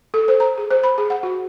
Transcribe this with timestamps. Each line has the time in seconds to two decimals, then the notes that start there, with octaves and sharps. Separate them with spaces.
0.14 A4
0.28 C5
0.40 A#5
0.58 G#4
0.71 C5
0.84 B5
0.98 G#4
1.10 F#5
1.23 F#4